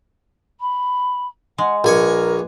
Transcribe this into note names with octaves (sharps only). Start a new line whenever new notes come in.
B5
G#3 F#5
A#1 A#4 B4 G#5 C#6